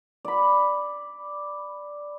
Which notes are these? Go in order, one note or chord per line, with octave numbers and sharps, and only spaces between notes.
D5 B5